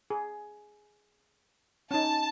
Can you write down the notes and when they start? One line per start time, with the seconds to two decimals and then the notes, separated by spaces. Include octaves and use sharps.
0.10 G#4
1.91 C#4 D#4 A5